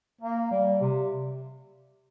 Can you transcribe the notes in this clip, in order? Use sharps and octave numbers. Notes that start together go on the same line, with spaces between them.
A#3
G3
C3